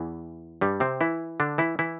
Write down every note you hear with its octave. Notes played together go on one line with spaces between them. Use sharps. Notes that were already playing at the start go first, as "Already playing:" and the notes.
Already playing: E2 E3
G2 G3
C3 C4
E3 E4
D3 D4
E3 E4
E3 E4